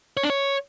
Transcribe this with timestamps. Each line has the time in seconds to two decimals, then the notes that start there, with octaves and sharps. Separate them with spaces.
0.17 C#5
0.23 D4
0.30 C#5